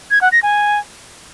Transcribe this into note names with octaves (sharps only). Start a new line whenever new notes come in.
G#6
F#5
A#6
G#5